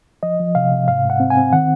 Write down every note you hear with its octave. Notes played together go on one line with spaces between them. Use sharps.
F3 D#5
F3
C3 F5
C3
G#2 F5
G#2
F#5
C4
G#5
C4
D#3 F#5